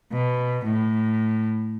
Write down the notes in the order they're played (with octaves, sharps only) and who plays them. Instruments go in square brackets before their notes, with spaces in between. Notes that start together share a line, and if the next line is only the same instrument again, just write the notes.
[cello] B2
A2